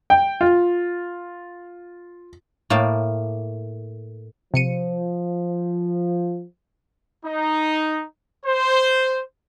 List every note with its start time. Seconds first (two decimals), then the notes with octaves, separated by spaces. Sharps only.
0.10 G5
0.41 F4
2.70 A2 A#3 G5 A5
4.54 C3 F3 C#7 D#7
7.24 D#4
8.45 C5